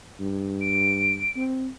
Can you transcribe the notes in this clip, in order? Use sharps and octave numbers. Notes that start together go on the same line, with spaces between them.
G2
D7
C4